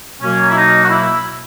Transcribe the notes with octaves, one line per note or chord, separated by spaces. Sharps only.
B2 F#3 A#3 C#4
E4
D#4
F#4
E4